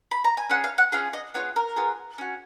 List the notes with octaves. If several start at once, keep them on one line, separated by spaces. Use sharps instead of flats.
B5
A#5
G#5
C#4 F4 G#4 F#5
F5
F#5
C#4 F4 G#4 F5
D#5
B3 F4 G#4 C#5
A#4
B3 F4 G#4
C#4 F#4